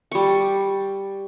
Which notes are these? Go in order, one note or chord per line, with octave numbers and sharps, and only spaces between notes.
G3 C#6